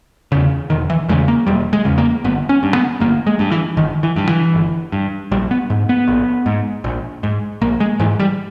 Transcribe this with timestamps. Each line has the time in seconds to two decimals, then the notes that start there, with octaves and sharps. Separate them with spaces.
0.32 E2 C#3
0.70 E1 D#3
0.90 E3
1.09 E2 C#3 G#3
1.28 A#3
1.47 E1 G3
1.73 G#3
1.85 E2 C#3
1.98 A#3
2.24 G1 B3
2.49 C#4
2.63 G2
2.75 B3
3.00 G1 A#3
3.27 G#3
3.39 G2
3.51 E3
3.77 G1 D#3
4.03 E3
4.16 G2
4.29 E3
4.54 G1
4.92 G2
5.32 A#1 G3
5.51 B3
5.70 G#2
5.89 B3
6.08 A#1
6.46 G#2
6.84 A#1
7.23 G#2
7.61 A#1 A#3
7.80 G#3
8.00 G#2 E3
8.20 G3